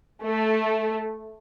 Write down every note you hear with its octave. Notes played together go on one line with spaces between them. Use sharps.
A3